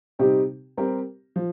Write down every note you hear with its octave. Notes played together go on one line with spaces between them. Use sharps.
C3 G3 C4 D#4 G4
G3 C4 G4 A#4
F3